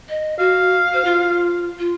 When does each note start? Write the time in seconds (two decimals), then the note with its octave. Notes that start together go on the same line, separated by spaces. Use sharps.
0.09 D#5
0.39 F#4 F5
0.93 C5
1.05 F4
1.79 F4